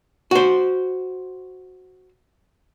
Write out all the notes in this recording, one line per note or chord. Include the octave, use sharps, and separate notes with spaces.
F#4 C5